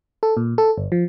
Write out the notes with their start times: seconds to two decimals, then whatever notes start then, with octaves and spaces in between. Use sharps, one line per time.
0.23 A4
0.37 A#2
0.58 A4
0.78 G1
0.92 F3